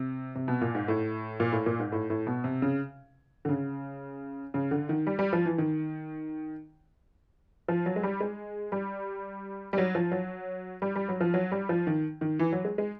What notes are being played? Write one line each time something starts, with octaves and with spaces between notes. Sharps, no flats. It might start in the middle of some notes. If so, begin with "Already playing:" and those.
Already playing: C3
C3
B2
A#2
G#2
A2
A#2
A2
A#2
G#2
A2
A2
B2
C3
C#3
D3
C#3
C#3
D3
D#3
G3
G3
F3
E3
D#3
F3
F#3
G#3
G3
G#3
G3
G3
F#3
F3
F#3
G3
G3
F#3
F3
F#3
G3
F3
D#3
D#3
E3
F#3
G#3
G#3